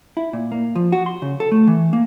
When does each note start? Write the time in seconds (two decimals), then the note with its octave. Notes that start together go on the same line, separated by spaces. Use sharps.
0.17 E4
0.33 A#2
0.52 A#3
0.76 F3
0.92 F#4
1.06 C6
1.22 C#3
1.40 A4
1.52 A3
1.67 E3
1.93 A#3